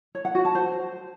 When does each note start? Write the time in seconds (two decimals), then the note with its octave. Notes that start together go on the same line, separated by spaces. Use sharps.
0.15 C#5
0.25 F#5
0.35 F#4
0.45 A5
0.55 C5